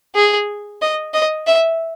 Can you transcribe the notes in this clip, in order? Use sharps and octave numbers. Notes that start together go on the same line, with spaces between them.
G#4
D#5
D#5
E5